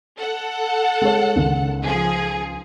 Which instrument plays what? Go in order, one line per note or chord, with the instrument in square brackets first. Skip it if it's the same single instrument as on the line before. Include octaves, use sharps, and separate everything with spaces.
[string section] A4 F#5
[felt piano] G#3 C#5
C#2 D#3
[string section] F3 G#4